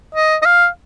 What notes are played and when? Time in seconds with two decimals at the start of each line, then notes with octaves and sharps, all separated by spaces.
0.14 D#5
0.42 D#5
0.46 F5